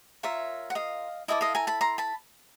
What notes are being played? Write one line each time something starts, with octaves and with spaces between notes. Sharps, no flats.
F4 A#4 C#5 E5
F#5
D#5 F5
E4 A4 D5 D#5
D#5 F5
G#5 A#5
A5 B5
A#5 C6
A5 B5